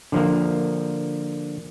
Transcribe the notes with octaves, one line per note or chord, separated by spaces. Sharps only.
D3 F3 A#3